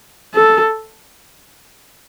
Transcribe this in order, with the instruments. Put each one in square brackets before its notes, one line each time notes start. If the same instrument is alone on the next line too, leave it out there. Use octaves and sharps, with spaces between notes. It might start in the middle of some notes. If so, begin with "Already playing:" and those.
[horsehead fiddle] A4